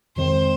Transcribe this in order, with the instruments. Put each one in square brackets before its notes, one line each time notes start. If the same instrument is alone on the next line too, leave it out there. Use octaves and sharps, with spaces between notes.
[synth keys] F2 C3 D#3 G#3 C4 [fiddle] C5